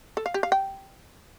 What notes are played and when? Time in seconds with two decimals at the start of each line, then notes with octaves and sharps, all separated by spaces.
0.17 A4
0.26 F5
0.34 G4
0.43 F5
0.52 G5